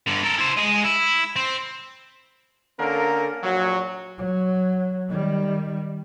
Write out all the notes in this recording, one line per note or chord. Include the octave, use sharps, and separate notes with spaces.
G2 D3
A4 A#4
E4 C5
G#3 D#5
E4
C4
D3 A#3 C#4 A4 A#4
A#1 A#2 F#3
F#3
D#3 G3